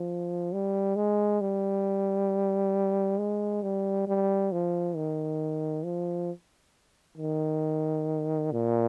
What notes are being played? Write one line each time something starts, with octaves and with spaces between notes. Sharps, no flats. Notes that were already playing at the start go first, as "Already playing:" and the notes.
Already playing: F3
G3
G#3
G3
G#3
G3
G3
F3
D#3
F3
D#3
A#2